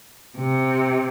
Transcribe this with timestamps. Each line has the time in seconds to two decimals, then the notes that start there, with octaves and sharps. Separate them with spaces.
0.37 C3